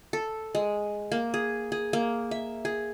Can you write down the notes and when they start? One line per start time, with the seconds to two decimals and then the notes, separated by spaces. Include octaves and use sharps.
0.13 A4
0.55 G#3
1.12 A#3
1.34 G#4
1.72 G#4
1.93 A#3
2.31 E5
2.65 G#4